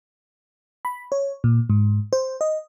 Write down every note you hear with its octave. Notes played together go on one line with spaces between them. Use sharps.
B5
C#5
A#2
G#2
C5
D#5